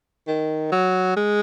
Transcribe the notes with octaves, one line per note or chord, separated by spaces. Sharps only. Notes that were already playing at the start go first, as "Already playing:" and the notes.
D#3
F#3
G#3